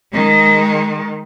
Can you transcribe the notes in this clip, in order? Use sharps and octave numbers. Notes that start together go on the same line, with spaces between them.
D#3 G#3